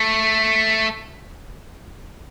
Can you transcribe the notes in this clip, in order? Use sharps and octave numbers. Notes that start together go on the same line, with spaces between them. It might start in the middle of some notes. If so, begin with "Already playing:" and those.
Already playing: A3